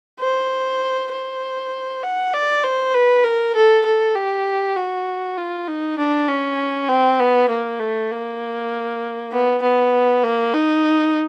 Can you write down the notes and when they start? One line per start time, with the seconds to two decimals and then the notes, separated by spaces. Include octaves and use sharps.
0.20 C5
1.12 C5
2.03 F#5
2.33 D5
2.64 C5
2.94 B4
3.24 A#4
3.55 A4
3.86 A4
4.15 G4
4.76 F#4
5.38 F4
5.68 D#4
5.98 D4
6.28 C#4
6.88 C4
7.19 B3
7.49 A#3
7.80 A3
8.11 A#3
9.32 B3
9.62 B3
10.24 A#3
10.54 D#4